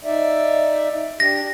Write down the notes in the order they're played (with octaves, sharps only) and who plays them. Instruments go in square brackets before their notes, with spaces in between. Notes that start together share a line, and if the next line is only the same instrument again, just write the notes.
[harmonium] D#4 D5 E5
[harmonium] D4 G4 [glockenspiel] A#6